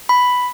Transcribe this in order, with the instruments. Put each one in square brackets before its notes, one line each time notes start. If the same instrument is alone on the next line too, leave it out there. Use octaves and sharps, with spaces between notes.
[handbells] B5